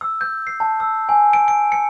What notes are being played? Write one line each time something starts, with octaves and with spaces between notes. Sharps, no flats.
E6
G6
C7
A5
E6
G#5
D7
D7
C#7